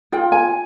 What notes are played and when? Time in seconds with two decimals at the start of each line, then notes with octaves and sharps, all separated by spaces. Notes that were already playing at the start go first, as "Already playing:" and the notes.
0.12 F4 G5
0.32 G#5